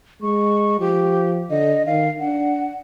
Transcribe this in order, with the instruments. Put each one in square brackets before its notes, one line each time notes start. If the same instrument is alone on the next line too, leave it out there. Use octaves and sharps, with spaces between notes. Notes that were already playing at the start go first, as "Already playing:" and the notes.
[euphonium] G#3 [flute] C#6
[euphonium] F3 [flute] G4
[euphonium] D3 [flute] D#5
[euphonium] D#3 [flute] F5
[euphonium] D4 [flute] F#5